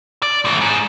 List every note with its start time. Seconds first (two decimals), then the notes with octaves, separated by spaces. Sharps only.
0.23 D5
0.45 A2 E3
0.61 G#2